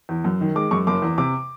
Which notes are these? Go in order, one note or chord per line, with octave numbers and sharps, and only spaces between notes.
E2
F#2
D#3
G#3 D6
F#2 C#6
F#1 D6
E2
C3 D6